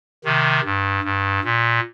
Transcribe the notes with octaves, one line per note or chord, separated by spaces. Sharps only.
C3 D#3
G2
G2
A#2